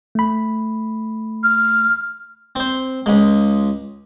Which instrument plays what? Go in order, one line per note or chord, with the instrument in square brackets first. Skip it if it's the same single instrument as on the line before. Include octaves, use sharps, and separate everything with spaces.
[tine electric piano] A3 B5
[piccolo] F6
[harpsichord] C4 C5
C#2 G#3